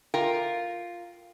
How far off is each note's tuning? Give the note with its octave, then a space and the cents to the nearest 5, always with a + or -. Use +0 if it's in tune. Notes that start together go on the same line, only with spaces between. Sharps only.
F4 +0 A#4 +0 G5 +0